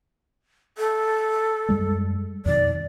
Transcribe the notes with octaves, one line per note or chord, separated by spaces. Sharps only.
A4
F#2 G3 G#3
F2 B2 D#3 D5